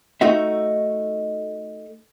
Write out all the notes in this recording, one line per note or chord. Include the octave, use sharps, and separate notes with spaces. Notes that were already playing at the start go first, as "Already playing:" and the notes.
A3 D#4 F#4 E5